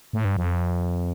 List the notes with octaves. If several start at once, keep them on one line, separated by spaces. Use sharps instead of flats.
A2
G2
F2